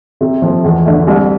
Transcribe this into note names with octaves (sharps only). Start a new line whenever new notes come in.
C3
F3 A3
E2
D3 A3
C2